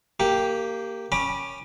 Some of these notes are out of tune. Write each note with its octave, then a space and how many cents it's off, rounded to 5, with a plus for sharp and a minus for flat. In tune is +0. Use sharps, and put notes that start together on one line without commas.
A#3 -15 G4 +0
C#4 +0 B5 -20 D6 +15